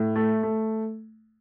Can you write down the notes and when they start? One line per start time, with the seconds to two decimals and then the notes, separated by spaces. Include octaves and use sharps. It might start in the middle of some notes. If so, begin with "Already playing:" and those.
Already playing: A2
0.16 A3
0.43 A3